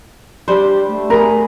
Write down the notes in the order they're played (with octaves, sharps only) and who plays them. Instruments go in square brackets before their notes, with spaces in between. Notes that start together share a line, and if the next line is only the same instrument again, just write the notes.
[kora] G3 D4 C5 [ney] G4
[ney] A3
[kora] G#4 B4 [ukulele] A#4